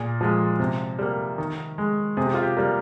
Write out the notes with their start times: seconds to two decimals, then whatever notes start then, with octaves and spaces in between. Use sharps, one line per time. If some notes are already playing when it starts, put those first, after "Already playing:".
Already playing: A#2 G#4
0.21 F3 G#3
0.60 C3
0.99 G3 A#3
1.38 D#3
1.78 G#3
2.17 C3 G#4
2.26 G4
2.34 F4
2.43 G4
2.57 G3 A#3